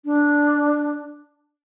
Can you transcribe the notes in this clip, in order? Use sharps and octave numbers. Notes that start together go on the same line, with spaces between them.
D4